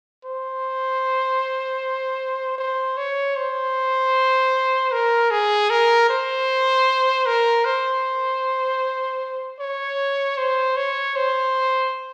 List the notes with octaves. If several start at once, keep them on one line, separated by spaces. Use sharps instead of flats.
C5
C5
C#5
C5
A#4
G#4
A#4
C5
A#4
C5
C#5
C5
C#5
C5